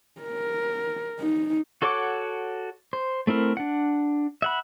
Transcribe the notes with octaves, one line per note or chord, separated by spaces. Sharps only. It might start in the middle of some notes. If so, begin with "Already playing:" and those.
A#4
D#4
F#4 A4 C#5 F#5 D6
C5
A3 C4 E4 A#4
D4 F#5
E5 F#5 B5